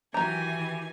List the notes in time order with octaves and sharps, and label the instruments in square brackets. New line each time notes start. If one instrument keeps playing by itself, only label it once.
[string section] D#3 E3 [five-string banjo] F#3 A#5 [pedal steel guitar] G4 [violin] G#5